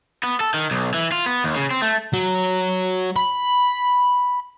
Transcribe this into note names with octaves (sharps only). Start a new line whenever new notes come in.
B3
A4
D#3
B1
E3
F4
B3
D#2
C#3
C4
A3
F#3
B5